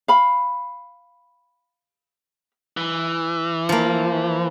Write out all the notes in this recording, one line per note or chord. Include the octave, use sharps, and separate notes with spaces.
F5 B5
E3
F3 A#3